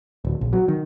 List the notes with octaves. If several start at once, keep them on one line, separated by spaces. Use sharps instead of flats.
D1
A#1
F#3
D#3